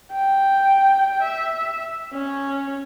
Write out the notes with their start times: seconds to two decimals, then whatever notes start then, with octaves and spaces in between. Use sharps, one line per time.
0.12 G5
1.22 E5
2.13 C#4